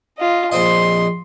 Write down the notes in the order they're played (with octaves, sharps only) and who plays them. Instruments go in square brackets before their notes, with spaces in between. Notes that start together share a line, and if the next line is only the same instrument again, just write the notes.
[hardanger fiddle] F4 D#5
[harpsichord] A#1 C4 D#5 [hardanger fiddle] C6